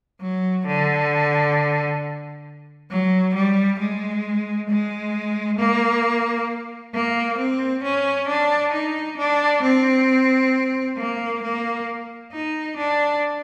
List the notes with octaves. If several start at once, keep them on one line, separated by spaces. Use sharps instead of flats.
F#3
D3
F#3
G3
G#3
G#3
A#3
A#3
C4
C#4
D4
D#4
D4
C4
A#3
A#3
D#4
D4